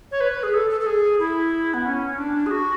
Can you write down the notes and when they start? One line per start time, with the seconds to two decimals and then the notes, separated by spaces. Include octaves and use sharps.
0.12 C#5
0.21 B4
0.43 G#4
0.54 A4
0.70 A4
0.81 A4
0.86 G#4
1.19 E4
1.74 B3
1.86 C#4
2.18 D4
2.46 G#4
2.51 F#4